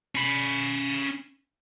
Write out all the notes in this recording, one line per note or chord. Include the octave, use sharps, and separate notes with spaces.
C#4 B5